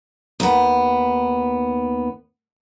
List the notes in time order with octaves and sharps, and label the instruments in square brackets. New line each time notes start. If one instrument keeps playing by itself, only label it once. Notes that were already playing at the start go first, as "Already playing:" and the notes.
[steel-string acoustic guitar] D#2 B3